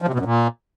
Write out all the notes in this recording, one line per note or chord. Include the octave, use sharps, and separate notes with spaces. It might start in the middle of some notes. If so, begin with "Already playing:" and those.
F3
C3
B2
F#2
A#2